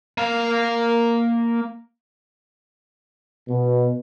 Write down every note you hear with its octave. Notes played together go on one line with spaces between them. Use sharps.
A#3 F5
B2